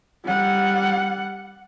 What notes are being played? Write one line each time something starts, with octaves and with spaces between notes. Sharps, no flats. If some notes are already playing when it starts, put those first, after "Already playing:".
G3 F#5